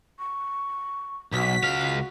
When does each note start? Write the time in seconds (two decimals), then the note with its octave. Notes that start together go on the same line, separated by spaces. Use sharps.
0.19 C#6
1.33 B1 F#4 B6
1.63 C#2 F5